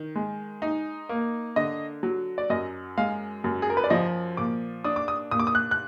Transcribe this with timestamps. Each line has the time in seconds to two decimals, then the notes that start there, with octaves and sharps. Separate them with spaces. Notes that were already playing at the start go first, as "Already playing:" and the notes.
Already playing: D#3
0.16 G#3
0.62 D#4
1.09 A#3
1.56 D3 D#5
2.03 F#3
2.38 D5
2.50 F#2 D#5
2.97 G#3 F5
3.44 F#2
3.62 G#4
3.70 A#4
3.77 B4
3.84 D5
3.90 F3 D#5
4.37 A#2 D6
4.84 D4 D#6
4.96 D6
5.08 D#6
5.31 A#2 D#6
5.39 D6
5.47 D#6
5.55 F#6
5.71 F#6